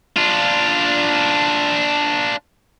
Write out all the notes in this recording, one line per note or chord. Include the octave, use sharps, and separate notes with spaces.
D4 F4